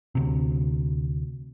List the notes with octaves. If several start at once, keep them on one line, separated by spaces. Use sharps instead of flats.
D2 C3